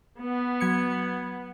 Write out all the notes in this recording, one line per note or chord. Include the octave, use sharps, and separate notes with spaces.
B3
F#3 G#6 C#7